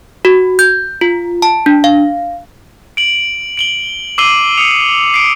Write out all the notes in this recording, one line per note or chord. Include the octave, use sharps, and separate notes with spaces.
F#4
G6
F4
A5
D4
F5
D7 F#7
D7 F#7 G7
D6 E6 C7 D#7 F#7 G7
D#6 C#7 F7
C7 D7